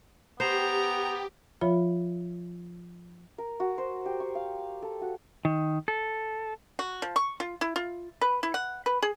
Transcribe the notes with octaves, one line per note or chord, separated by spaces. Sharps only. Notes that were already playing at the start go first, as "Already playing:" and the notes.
B3 G4 C5 A#5
F3 F4 C#5 E5 B5
A#4
F#4
C5
G4
C#6
F5
A4
F#4
D#3
A4
F#4
F3
C#6
F4
E4
F4
B4
E4
F#5
B4
G#4